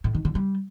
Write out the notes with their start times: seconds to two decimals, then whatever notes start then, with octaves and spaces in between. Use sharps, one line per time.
0.04 A2
0.15 D#3
0.25 D3
0.35 G3